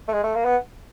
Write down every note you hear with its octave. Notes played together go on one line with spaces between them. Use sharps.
A3
G#3
A3
A#3
B3